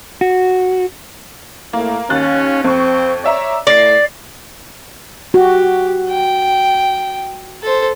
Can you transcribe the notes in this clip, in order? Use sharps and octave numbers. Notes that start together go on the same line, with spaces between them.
F#4
A2 A#3
D#2 C#4 F#6 A6
F2 C4 C#6
C#5 D5 E5 A#5
A2 D5 A#6 C7
F#4 G4
G5
A4 C5